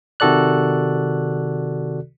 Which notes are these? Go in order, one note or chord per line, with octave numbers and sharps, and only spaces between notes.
C3 D#3 F#4 A4 D5 F#6